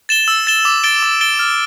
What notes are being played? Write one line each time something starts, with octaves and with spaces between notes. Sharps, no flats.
A6 E7 G7
E6
A6 E7 G7
D6
A6 D7 G7
D6
A6 D7 G7
F6